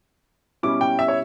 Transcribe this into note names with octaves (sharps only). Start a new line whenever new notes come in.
B2 G3 C#4 E4 D6
G5
E5
C#5